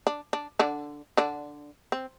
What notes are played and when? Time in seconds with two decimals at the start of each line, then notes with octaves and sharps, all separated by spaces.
0.07 D4
0.33 D4
0.59 D3 D4
1.17 D3 D4
1.92 C4